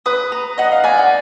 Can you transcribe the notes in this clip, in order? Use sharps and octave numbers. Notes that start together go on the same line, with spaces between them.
B4 D#6
A#5
D#5 F#5
F5
D5 G#5
F#5